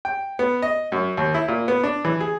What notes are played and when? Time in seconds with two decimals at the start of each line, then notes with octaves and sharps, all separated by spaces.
0.05 G5
0.39 B3
0.62 D#5
0.92 F#2
1.17 D#2
1.34 E4
1.48 A#2
1.68 B3
1.83 D4
2.05 E3
2.20 G#4